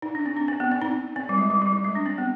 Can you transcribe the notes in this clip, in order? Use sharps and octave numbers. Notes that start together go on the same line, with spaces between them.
D#4
D4
C4
D4
C4
B3
C4
D#4
C4
G3
G#3
G3
G3
G3
G#3
D4
C4
B3